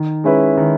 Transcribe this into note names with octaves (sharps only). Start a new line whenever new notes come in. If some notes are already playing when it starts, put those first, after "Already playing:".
Already playing: D#3
G#3 C#4 E4 B4
D#3